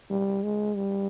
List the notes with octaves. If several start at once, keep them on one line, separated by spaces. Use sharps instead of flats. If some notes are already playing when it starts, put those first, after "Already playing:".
G3
G#3
G3